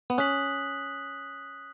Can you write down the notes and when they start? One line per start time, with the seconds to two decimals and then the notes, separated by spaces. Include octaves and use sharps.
0.10 B3
0.18 C#4 D#6 F#6 B6 F#7